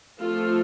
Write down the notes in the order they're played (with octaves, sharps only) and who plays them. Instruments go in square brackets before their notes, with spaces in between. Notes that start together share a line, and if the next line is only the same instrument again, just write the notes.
[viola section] F3 A3 C4 F4 A4